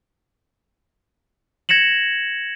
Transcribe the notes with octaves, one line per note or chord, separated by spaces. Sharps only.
G#6 A#6 C#7 E7 F#7